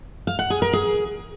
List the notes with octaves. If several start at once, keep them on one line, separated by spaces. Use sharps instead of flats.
F5
F#5
G#4
A#4
G#4